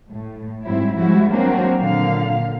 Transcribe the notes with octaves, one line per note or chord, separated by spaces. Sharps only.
A2
G#2 F#3 G3 C4 E4
F3 G3 G#3 E4 F#4
F#3 A#3 C4 D4 F#4 A#4
A#2 D3 F5